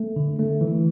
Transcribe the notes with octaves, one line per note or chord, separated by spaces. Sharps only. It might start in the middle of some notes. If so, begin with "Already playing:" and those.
Already playing: A3
D3
A3
E3